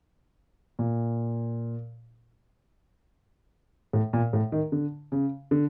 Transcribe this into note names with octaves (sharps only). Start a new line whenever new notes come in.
A#2
A2
A#2
A2
D#3
D3
C#3
D3